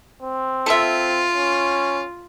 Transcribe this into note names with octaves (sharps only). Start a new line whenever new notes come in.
C4
F4 A4 E5
C#4